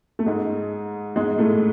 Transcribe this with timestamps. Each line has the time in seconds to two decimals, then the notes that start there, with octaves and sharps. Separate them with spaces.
0.19 A3
0.26 G#2 G#3
1.16 G#2 G#3
1.38 A2 A3